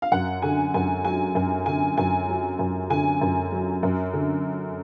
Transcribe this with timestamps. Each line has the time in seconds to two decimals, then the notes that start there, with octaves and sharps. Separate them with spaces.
0.02 F5
0.12 F#2 F#5
0.42 D3 G#5
0.74 F#2 G#5
1.04 F#3 G#5
1.35 F#2 G#5
1.66 D3 G#5
1.97 F#2 G#5
2.28 F#3
2.59 F#2
2.90 D3 G#5
3.21 F#2
3.52 F#3
3.83 F#2
4.13 D3